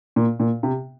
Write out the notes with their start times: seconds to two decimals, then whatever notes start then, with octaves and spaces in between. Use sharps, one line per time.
0.16 A#2
0.40 A#2
0.63 C3